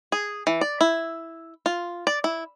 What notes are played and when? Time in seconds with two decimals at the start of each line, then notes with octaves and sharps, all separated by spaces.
0.12 G#4
0.47 E3
0.61 D5
0.81 E4
1.66 F4
2.07 D5
2.24 E4